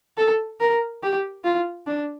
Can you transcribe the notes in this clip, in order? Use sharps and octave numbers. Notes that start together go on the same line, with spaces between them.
A4
A#4
G4
F4
D4